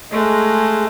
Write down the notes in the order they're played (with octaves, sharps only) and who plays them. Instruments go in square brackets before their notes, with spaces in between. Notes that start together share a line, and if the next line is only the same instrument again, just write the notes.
[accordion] G#3 [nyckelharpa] A3